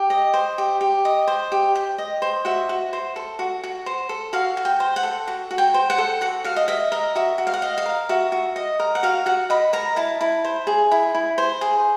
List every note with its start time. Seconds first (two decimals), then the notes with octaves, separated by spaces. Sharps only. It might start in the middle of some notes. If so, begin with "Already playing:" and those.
Already playing: G4
0.10 D#5
0.34 C5
0.58 G4
0.81 G4
1.05 D#5
1.27 C5
1.52 G4
1.75 G4
1.98 D#5
2.22 C5
2.45 F#4 E5
2.69 F#4
2.93 C5
3.16 A4
3.39 F#4
3.64 F#4
3.86 C5
4.09 A4
4.33 F#4 F5
4.57 F#4
4.65 G5
4.80 C5
4.96 F#5
5.03 A4
5.28 F#4
5.51 F#4
5.58 G5
5.74 C5
5.90 F#5
5.98 A4
6.21 F#4 F#5
6.44 F#4 F5
6.56 D#5
6.68 D#5 E5
6.92 A#4 D#5
7.15 F#4 E5
7.38 F#4
7.47 F5
7.54 F#5
7.62 D#5 F5
7.78 F5
7.86 A#4
8.09 F#4 E5
8.32 F#4
8.56 D#5
8.80 A#4
8.95 F#5
9.03 F#4 F5
9.26 F#4 F#5
9.50 D#5 B5
9.73 A#4 A#5
9.96 E4 A5
10.21 E4
10.45 C5
10.67 G#4
10.91 E4
11.15 E4
11.38 C5
11.61 G#4